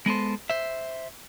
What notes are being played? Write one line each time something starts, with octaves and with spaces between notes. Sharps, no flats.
G#3 B3 A4 C5
C5 E5